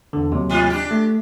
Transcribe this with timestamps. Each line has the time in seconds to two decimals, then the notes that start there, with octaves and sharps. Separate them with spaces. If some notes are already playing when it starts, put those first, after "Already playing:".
0.13 E2 D3
0.32 D#2 C3 F#3
0.50 G#2 F4
0.70 D4 G4
0.91 A3